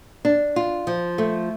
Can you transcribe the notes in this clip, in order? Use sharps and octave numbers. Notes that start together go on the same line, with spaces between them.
D4
F4
F3
A3